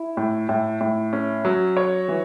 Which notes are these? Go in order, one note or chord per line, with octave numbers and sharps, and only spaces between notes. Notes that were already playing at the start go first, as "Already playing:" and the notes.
Already playing: E4
A2
A2
A2
C#4
F#3
C#5
E3